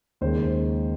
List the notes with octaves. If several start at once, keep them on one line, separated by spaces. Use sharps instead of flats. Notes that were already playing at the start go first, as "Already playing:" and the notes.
D#2 C#3 G#3 C5